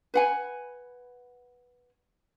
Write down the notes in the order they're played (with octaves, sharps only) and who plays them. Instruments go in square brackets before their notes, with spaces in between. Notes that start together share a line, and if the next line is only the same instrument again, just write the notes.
[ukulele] B4 F#5 G#5